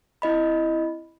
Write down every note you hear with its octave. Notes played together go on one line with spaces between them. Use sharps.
C4 E4 D#5 B5